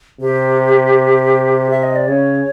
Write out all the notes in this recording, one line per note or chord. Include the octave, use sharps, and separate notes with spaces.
C3 G4
E5
D#5
D5
C#3 C#5